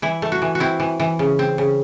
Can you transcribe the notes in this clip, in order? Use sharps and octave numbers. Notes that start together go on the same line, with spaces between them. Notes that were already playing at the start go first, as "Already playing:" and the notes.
E3 E4
A3
F#4
E3
F#4
C4 E4
E3
E3
C#3
C4
C#3